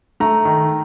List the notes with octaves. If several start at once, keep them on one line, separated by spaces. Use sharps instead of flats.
A3 A#5
D#3